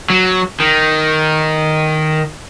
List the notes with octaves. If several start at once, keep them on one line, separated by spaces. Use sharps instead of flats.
F#3
D#3